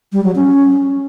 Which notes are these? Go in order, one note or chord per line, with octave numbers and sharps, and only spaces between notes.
G3
F#3
C#4